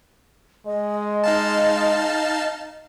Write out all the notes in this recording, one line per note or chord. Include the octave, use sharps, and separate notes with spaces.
G#3 D#5
D#4 F5 A5